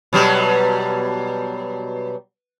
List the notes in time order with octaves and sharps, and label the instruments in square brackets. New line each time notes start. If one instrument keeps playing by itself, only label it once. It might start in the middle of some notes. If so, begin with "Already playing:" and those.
[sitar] B2 F#3 G3